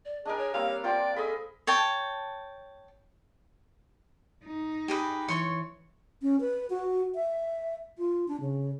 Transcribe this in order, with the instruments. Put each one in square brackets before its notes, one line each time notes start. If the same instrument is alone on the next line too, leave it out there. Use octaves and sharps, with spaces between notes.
[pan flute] D5
[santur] D4 A#4 [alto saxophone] G#4 [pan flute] D#5
[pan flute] C#5
[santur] G3 A#3 C4 [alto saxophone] F5
[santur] F4 C5 C6 [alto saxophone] D5 [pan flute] G5
[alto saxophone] G#4 [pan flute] A4 [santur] D#5 B5
[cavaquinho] C#5 G5 A5
[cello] D#4
[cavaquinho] G4 G#4 B4
[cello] E3 [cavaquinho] C#5 C6 C#6
[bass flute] C#4
B4
F#4
E5
F4
D4
C#3